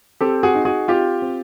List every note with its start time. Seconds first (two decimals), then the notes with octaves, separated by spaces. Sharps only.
0.21 C4 G4 A4
0.43 F#4 G#4
0.55 D#4
0.65 F#4 G#4
0.88 C4 F4 G4
1.22 C4